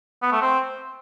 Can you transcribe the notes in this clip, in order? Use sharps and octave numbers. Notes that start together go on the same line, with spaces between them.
B3
A3
C4